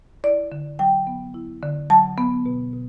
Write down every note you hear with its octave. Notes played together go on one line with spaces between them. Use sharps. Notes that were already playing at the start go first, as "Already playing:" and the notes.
E4 D5
D3
F#3 G5
B3
E4
D3
F#3 A5
B3
B2
B2